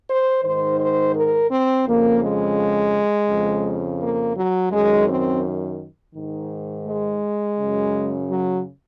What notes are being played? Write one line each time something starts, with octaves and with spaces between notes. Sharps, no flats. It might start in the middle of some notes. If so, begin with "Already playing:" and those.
C5
G#2 D#3 C5
C5
A#4
C4
F2 C#3 A#3
G#3
F2 C#3
A#3
F#3
F#2 D#3 G#3
C4
G#2 D#3
G#3
F#2 C#3
F#3